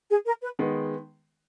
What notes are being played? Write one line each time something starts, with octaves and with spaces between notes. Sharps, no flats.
G#4
A#4
B4
D#3 G#3 B3